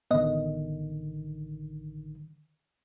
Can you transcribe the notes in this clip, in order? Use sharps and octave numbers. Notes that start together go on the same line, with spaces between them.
A1 D3 D#3 B3 D#5